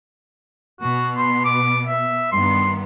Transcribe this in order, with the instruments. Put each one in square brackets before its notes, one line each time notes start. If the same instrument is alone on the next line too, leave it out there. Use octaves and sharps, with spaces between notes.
[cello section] B2 B3 [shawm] F#4
[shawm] C6
D6
E5
[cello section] G2 D#3 B3 [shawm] C6